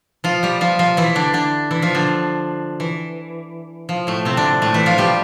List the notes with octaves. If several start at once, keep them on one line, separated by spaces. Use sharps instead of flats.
F3 F4
G3 G4
F3 F4
F3 F4
E3 E4
D3 D4
D3 D4
E3 E4
F3 F4
D3 D4
E3
F3
A2 A3
C3 C4
D3 D4
A2 A3
E3 E4
F3 F4
G3 G4